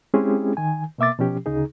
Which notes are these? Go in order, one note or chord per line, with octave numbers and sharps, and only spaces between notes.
G#3 C4 C#4 E4 G4 G#4
D#3 G#5
B2 A#3 E5 D6 A6
B2 F3 C#4 G4
D2 C#3 D#4 G#4